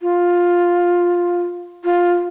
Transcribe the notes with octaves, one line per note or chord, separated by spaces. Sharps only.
F4
F4